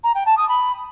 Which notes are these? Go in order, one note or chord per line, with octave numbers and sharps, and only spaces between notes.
A#5
G5
A5
D#6
B5